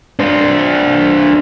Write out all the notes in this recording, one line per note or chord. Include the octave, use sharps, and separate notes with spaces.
D4 C5